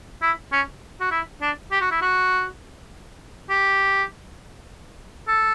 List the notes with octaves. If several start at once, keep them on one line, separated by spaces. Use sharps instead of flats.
E4
C#4
F#4
E4
D4
G4
F#4
E4
F#4
G4
A4